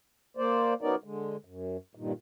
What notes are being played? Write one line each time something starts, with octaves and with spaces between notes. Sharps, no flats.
A#3 C5 D5
F#3 B3 C#4 D#4 A#4 D5
D3 G#3
F#2
G2 A#2 D#3